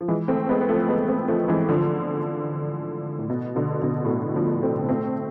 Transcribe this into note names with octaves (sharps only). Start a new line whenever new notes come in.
F3
E3 G#3
A3 C4
G#3 B3
B3
F3 A3
G#3 B3
A3 C4
F3 A3
E3 G#3
D3 F3
A2
B2
B2 D3
B2 D3
A2
B2
D3 F3
A3 C4
A3 C4